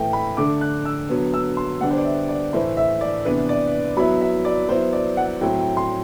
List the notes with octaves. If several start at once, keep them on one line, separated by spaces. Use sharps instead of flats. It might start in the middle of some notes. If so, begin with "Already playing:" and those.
Already playing: A2 E3 A3 G5
B5
D3 A3 D4 D6
F#6
E6
D3 F#3 B3
E6
C6
D3 G3 B3 D4 F#5
C5
D5
E5
D5
A2 E3 A3 E4 C5
E5
D5
C3 E3 B3 D4 B4
D5
F#3 B3 E4 B5
E5
D5
F#3 B3 E4 C5
D5
F#5
A2 F#3 A3 C4 G5
G5
C6